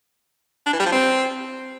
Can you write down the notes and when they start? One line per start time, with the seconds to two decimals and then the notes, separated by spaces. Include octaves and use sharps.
0.66 D4
0.73 E3
0.79 G3
0.86 F3
0.92 C4